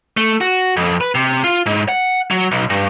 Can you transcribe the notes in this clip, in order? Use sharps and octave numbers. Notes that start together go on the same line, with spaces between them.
A3
F#4
F2
B4
C3
F4
G#2
F#5
F#3
B1
G2